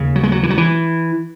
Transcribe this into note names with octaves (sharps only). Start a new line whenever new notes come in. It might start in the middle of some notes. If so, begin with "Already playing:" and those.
Already playing: D#2 C#3
F#3
G#3
F#3
E3
F#3
E3